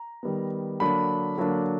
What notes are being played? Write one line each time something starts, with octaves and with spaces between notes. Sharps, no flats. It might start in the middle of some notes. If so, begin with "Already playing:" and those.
Already playing: A#5
D#3 G3 B3
D3 F#3 A#3 D4 B5
D3 F#3 A#3 D4